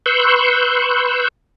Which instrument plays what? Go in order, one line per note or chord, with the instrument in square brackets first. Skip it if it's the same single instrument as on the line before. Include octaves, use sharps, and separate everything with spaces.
[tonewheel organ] B4 C6 C#6 E6 F#6 G6